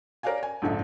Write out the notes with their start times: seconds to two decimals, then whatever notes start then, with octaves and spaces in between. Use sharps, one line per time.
0.23 A#4 C#5 D5 F5 G#5
0.43 G#5
0.62 A#1 F2 G#2 C#3 A4 E5